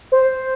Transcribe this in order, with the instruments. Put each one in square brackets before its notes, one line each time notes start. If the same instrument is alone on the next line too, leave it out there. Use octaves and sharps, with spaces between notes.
[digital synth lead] C5